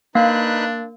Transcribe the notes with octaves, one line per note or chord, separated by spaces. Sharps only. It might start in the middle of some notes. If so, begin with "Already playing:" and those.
A#3 D4 D#4 B4 F5 F#6